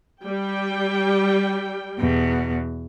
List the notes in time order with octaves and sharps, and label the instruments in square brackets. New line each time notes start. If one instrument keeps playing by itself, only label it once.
[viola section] G3 G5
[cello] E2 B2